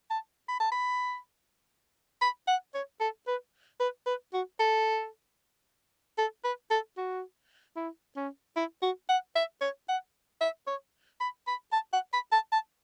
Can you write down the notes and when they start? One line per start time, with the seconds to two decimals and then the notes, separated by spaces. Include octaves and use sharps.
0.10 A5
0.48 B5
0.60 A5
0.72 B5
2.21 B5
2.47 F#5
2.74 C#5
3.00 A4
3.27 B4
3.80 B4
4.06 B4
4.33 F#4
4.59 A4
6.18 A4
6.44 B4
6.71 A4
6.97 F#4
7.76 E4
8.16 C#4
8.56 E4
8.82 F#4
9.09 F#5
9.35 E5
9.61 C#5
9.89 F#5
10.41 E5
10.67 C#5
11.20 B5
11.47 B5
11.73 A5
11.93 F#5
12.13 B5
12.32 A5
12.52 A5